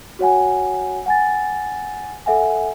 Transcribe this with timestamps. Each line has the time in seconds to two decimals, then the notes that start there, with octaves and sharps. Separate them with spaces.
0.19 F#4 C#5 F#5 G#5
1.06 F#5 G#5 A6
2.26 A4 E5 F#5 G#5